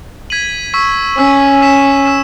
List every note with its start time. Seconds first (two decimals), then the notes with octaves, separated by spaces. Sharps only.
0.30 G#6 B6 D#7 F#7
0.74 C#6 E6 B6
1.17 C#4 C#6 E6 B6
1.61 E6 B6 E7
2.05 E6 B6 E7